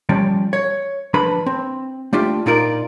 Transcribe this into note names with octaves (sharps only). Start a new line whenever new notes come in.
F3 G3 C#4 D5
C#5
F3 D4 B4 B5
C4
A3 D4 F4 G4
A#2 D#4 F4 A#4 D5